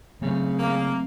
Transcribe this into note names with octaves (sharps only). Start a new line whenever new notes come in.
C#3 F#3 A3 C4
A#3